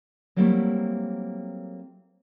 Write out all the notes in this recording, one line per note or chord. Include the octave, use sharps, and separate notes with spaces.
F#3 G3 A3 A#3 C4 E4